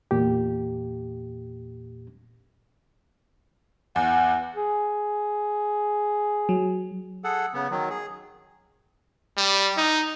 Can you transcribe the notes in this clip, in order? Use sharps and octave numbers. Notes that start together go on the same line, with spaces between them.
E2 A#2 G4
E2 F#5
G#4
F#3
G#4 A4 F#5
C#3 B3
D#3 F#3
G#4
G3
D#4